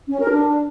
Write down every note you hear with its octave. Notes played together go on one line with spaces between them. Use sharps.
C#4
A#4
D4